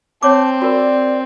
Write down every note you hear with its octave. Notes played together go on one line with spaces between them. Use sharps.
C4 C#5 A5 D6
F#4 A#4 D5